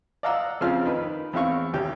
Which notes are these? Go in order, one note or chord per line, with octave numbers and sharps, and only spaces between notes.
D5 D#5 F5 F#5 A#5 E6
F2 C#3 F3 C4 F4 F6
D#3 B4
E2 C4 E4 F5 C#6
G#1 D2 G4